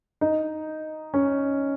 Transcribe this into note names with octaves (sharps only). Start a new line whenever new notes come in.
D#4
C#4